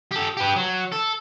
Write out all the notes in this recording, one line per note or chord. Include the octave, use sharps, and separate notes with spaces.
G4 A4
G4 B4
F#3
A4